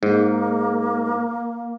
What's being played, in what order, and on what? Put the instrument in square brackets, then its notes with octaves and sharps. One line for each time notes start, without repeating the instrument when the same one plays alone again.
[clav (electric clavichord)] G#2 [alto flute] A#3